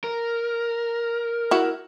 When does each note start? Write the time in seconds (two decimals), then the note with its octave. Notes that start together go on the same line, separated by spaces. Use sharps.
0.04 A#4
1.51 E4 F#4